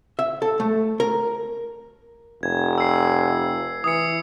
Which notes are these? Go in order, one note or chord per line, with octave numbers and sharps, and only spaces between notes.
E5
A4
A3
A#4
F1 G#6
E6 C7
E3 D#6 C#7